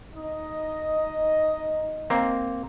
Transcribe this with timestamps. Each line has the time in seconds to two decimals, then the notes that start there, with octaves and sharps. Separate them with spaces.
0.15 D#4 D#5
2.10 A#3 C4